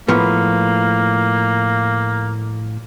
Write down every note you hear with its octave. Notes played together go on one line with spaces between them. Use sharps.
A2 F3 A#3 B3